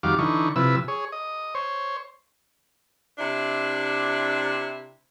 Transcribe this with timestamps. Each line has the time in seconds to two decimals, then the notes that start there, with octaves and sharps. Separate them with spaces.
0.03 F2 D#3 G3 F#4 F5 D6
0.19 D3 E3 D#4 C#6
0.56 C3 F3 E4 B4 E6
0.88 G#4 C#5
1.12 D#5
1.55 C5 C#5
3.18 C3 D4 E4